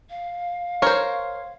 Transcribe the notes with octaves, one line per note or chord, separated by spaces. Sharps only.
F5
A#4 C5 C#5